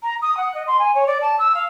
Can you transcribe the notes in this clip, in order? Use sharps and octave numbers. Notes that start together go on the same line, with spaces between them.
A#5
D#6
F#5
D#5
C6
G#5
C#5
D5
A5
E6
F5